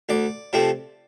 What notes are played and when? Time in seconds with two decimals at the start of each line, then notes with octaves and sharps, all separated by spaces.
0.09 D2 D5
0.53 C3 F3 A3 C4